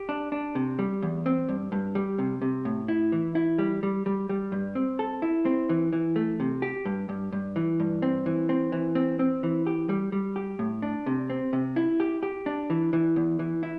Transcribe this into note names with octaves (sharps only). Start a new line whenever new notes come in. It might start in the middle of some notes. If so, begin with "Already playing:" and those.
Already playing: G4
D4
D4
C3
G3
E2
C4
G2
G2
G3
C3
C3
A2
E4
E3
E4
G3
G3
G3
G3
G2
C4
A4
E4
C4
E3
E3
A3
C3
G4
G2
G2
G2
E3
G2
C4
E3
C4
E3
C4
C4
E3
G4
G3
G3
G4
A2
D4
C3
C4
C3
E4
G4
G4
D4
E3
E3
E2
E3
E4